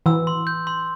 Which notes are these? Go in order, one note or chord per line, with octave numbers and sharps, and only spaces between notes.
E3 E6
C6
G6
C6